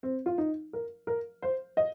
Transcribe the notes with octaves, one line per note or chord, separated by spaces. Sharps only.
C4
F4
D#4
A#4
A#4
C5
D#5